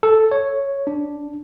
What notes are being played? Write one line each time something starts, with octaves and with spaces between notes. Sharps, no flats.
A4
C#5
D4